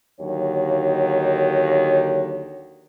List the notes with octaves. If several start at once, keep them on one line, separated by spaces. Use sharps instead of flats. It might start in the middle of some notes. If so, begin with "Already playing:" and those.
D#2 D3 F#3 C#5